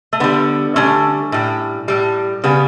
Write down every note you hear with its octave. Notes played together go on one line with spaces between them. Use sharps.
A3
D3 G3 B3
D3 G3 A3 C#4
A2 G3
A2 G3
C#3 G3 B3